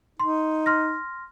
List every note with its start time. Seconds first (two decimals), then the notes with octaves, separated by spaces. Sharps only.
0.20 D#4 C6
0.66 C6 F6 A#6